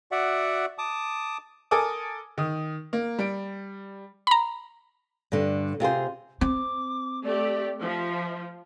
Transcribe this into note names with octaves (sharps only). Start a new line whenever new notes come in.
F#4 D5 E5 F#5
A5 D6 D#6
A4 A#4 G#5 D6 D#6
D#3 D#6
A#3
G3 D7
A#5 B5
G2 D3
C3 F4 G#4 C5
C4 D6
A3 G4 D5
F3 E5